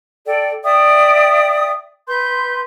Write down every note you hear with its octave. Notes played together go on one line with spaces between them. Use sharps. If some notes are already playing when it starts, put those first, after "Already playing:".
A4 D5 G5
D5 E5 G5 D#6
B4 C6 G6